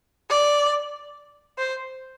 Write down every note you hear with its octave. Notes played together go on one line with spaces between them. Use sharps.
D5
C5